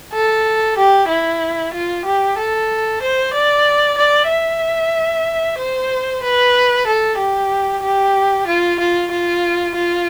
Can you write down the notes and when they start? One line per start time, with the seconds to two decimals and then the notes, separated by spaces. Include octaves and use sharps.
0.13 A4
0.77 G4
1.08 E4
1.74 F4
2.05 G4
2.38 A4
3.02 C5
3.33 D5
3.97 D5
4.29 E5
5.58 C5
6.23 B4
6.87 A4
7.18 G4
7.83 G4
8.47 F4
8.79 F4
9.11 F4
9.75 F4